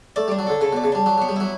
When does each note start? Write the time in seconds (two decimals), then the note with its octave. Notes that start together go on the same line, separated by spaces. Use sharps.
0.16 A3 D5
0.28 G3 D4
0.39 F#3
0.47 D3 A4
0.61 C#3 A3
0.73 B2 D5
0.84 C#3
0.92 G3 D4
1.06 F#3 G4
1.18 F#3 B3
1.29 G3
1.36 F#3 E4